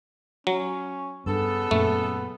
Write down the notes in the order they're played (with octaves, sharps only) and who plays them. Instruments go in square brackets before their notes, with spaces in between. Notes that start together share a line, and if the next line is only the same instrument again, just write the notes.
[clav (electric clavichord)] F#3 [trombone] C#4
[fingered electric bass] G2 [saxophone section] C#3 A4 [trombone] B3
[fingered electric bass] F#2 A#2 [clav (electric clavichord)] A3